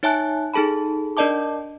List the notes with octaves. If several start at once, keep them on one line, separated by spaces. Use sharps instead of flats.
D#4 C#5 E5 G#5 A5 F#6
D#4 G#4 A4 A5 B5
D4 A#4 D5 D#5 A5 D6